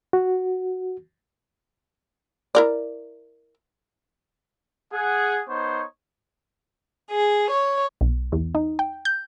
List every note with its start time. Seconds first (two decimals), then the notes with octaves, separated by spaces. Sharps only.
0.13 F#4
2.55 E4 A#4 D5
4.93 G#4 F#5
5.49 B3 D#4 C5 C#5
7.10 G#4
7.51 C#5
8.01 B1
8.32 E2
8.55 D#4
8.79 G5
9.05 G6